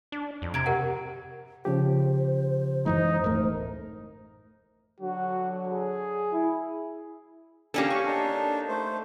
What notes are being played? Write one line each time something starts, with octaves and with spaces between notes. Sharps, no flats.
D4
F2
C3 A#5 G#6 D7
G4 A#4 F#5
C#3 F3 G4 C5
F#2 E3 G#3 D#4
D1 A1 A3 A#4
D3 F#3 F#4
G#4
E4
A#3 C#4 D4 G4 A4
C#6
D4 D#4
A3 C5